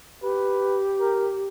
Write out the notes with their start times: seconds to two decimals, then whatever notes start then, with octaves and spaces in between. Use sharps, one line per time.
0.22 G4 B4
1.00 A#4